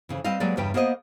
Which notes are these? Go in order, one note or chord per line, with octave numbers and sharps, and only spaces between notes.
F2 C#3 E3
G3 C4 B4 D#5 F5
F#3 G#3 A#3 G4 B4 D5
E2 G2 C#3 D4 B4 G5
A#3 B3 A#4 C5 D#5